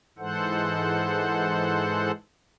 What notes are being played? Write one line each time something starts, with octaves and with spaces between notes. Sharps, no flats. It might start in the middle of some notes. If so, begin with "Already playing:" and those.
G#2 E3 G#3 A4 C5 F#5